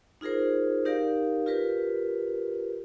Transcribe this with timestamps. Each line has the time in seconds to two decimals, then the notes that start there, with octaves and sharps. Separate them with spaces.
0.21 D#4 F4 G#4 A#4 C5
0.85 D#4 G4 A#4 D5 F5
1.46 F4 G4 A#4 B4